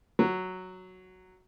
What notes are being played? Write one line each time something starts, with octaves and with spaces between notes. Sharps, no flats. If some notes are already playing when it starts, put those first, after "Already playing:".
F#3